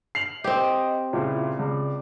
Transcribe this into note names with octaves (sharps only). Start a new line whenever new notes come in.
C7 F7 F#7
C4 G4 D#5
C#2 A#2 E4
C#2 D5